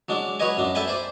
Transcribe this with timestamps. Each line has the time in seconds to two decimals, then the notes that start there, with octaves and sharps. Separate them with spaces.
0.09 F#3 G#3 D4
0.40 F#3 B4 C#5 D#5 G#5
0.58 F#2 D4
0.75 A4 E5 G5 G#5 B5
0.88 C5 D5